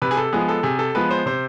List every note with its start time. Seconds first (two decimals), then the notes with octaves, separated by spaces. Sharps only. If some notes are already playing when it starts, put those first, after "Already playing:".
0.02 C3 B4
0.11 G#4
0.17 A4
0.33 F3 G#3 B3 G#4
0.48 A4
0.63 C3 G#4
0.79 A4
0.95 F3 G#3 B3 B4
1.11 C5
1.26 C3 C5